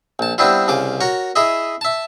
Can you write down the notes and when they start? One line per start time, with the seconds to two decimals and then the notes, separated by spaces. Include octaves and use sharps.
0.19 A#1 A5
0.38 G3 B3 C4 D4 E4 F4
0.68 C2 C#3 F4 D6
1.01 F#4 A#4 C#5
1.36 E4 G#4 D#5 E5
1.81 E5 A5